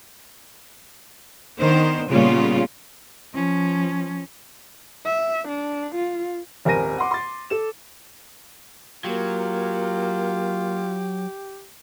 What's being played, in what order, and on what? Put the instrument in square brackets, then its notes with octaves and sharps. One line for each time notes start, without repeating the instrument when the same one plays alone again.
[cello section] D#3 B3 D4 C5
A#2 C#3 G3 B3 C#4 F4
[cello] F3 C#4
[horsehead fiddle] E5
D4
F4
[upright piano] D#1 G#1 A#4 G#5 A#6 D#7
F#5 C6 D6
C6 A6
A4 E7
[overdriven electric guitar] F#3 [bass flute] A#3 [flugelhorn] F4 [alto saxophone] G4